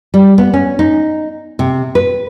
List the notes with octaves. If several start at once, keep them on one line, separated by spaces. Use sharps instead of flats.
G3
B3
C#4
D#4
C3
B4